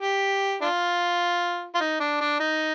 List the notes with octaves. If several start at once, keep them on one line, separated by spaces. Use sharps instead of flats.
G4
D4 F4
F4
D#4
D4
D4
D#4